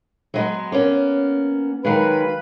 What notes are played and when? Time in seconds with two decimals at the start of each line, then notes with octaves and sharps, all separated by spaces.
0.34 F#3 G#3 B3
0.72 A#3 B3 C#4
1.85 D#3 F#3 G#3 B4 F5 B5